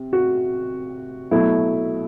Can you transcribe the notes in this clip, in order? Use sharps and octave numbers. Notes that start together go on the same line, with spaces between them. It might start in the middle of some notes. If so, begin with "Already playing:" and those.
Already playing: C3
F#4
B2 F#3 A3 E4